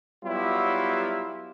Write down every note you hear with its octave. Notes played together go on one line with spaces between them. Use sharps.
F#3 G3 B3 E4 F4 G4